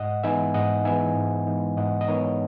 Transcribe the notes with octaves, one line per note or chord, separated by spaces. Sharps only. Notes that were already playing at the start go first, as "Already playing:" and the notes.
Already playing: G#2 D#5 F#5
E3 G#3 B3 D#4 E5 G#5
G#2 D#5 F#5
E3 G#3 B3 D#4 E5 G#5
G#2
E3 G#3 B3 D#4
G#2 D#5 F#5
D#5
E3 G#3 B3 D#4 A#4 C#5